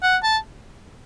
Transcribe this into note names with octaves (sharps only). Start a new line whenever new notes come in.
F#5
A5